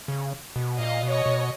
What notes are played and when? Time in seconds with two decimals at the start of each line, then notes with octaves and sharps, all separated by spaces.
0.08 C#3
0.56 B2
0.79 A#2 D#5 F5
1.03 B2
1.10 C#5 D#5
1.26 B2